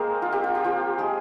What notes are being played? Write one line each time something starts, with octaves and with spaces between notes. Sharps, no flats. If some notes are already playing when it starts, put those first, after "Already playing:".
Already playing: G#3 A#3 C4 G#4 A#4 C5
F4
G4
F4
G4
F3 F4
G#3 G#4